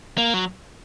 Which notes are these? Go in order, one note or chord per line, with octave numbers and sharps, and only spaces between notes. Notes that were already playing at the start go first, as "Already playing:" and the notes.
A#3
F#3